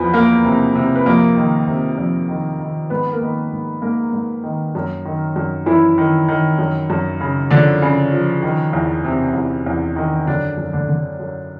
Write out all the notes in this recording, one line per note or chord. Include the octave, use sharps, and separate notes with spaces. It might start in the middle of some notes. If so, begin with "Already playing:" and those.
Already playing: E2 F3 B3 B4
F3 A#3 A#4
C3
C3
B4
F2 A#3 A#4
D#3
C3
F2
D#3
D#3
G#2 B3 B4
A#3 A#4
D#3
G#2
G#2 A#3 A#4
G#2
D#3
F#2
D#3
F#2
F#2 E3 E4
D#3
D#3
F#2
F#2
C#3
D3 F3 D4
C#3
F3
D#3
E2
C3
E2
E2
D#3
F#2 D3 D4
F#2
D3 D4
D3
F#2